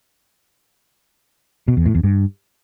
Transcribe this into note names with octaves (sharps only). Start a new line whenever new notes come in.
B2
E2
A2
E2
G2